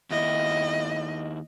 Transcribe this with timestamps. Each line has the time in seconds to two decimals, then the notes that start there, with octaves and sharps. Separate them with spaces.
0.10 D#2 E4 D#5